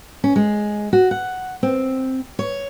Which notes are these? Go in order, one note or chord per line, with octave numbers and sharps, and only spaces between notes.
C#4
G#3
F#4
F#5
C4
C#5